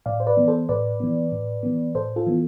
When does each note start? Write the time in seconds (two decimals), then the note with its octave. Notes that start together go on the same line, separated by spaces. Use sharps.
0.06 A2 D5 F5
0.20 C5
0.27 B4 D5
0.37 E3 B3
0.48 A4 C5
0.69 A2 B4 D5
1.00 E3 B3
1.32 A2
1.63 E3 B3
1.95 A2 A4 C5
2.16 F4 A4
2.27 E3 B3